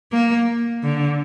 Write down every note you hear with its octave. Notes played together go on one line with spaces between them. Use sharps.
A#3
D3